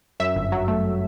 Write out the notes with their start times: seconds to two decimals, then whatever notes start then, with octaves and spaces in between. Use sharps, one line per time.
0.20 F#2 E5
0.35 G1
0.52 F#3
0.68 A3